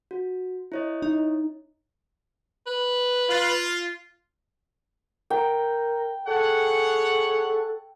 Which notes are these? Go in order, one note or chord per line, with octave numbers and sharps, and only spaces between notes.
F#4
E4 C#5 D#5
D#4
B4
F4
A#4 G5
G#4 A4 C#5 F#5